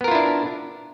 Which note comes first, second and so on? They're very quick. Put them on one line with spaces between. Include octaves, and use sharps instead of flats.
B3 A#4 F4 E4 D4